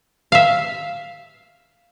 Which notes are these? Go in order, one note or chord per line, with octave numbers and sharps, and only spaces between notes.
E5 F5